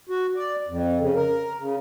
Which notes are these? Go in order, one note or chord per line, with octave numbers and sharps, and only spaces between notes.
F#4
D5
F2
C#3
A#4
C#3